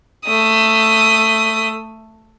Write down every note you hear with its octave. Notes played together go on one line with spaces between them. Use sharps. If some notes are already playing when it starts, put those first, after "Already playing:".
A3 D#6